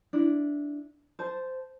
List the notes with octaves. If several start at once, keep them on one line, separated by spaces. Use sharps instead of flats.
D4 E4
C5 A5